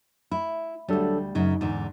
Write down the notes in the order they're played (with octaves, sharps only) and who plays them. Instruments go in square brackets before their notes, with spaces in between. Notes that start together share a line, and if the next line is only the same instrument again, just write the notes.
[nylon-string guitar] E4
[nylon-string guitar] D2 G3 [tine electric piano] F#3 D4 A4
[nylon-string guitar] F#2 C#3 [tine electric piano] D#4
[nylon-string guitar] E2 G#2 D3